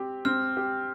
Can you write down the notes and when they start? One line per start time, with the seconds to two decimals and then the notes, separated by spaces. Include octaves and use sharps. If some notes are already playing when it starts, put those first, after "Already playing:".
Already playing: C4 G4
0.25 C4 F6
0.57 G4